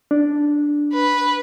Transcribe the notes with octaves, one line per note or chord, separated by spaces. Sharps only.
D4
B4